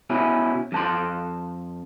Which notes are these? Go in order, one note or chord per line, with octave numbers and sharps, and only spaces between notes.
B2 C#4 E4
F2 A5 C6